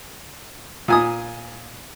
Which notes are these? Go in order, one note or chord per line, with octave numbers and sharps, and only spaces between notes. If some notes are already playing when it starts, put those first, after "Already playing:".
A#2 G#5 D#6